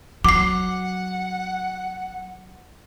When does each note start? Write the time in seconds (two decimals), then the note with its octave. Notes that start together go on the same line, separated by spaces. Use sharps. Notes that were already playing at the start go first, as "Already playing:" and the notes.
0.25 F#3 F#5 D6 C7